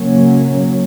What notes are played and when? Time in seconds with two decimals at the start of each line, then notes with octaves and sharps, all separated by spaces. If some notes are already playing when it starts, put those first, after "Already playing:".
Already playing: C#3 F#3 A#3 C#4